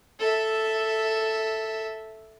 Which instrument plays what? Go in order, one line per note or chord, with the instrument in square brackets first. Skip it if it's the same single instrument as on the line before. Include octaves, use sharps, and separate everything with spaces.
[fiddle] A4 E5